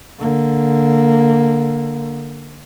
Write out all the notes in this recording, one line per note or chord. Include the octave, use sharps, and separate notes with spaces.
D3 A#3